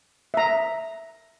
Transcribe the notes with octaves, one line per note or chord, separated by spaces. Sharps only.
E5 A#5